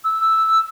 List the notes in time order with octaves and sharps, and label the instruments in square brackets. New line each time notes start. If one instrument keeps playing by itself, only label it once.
[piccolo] E6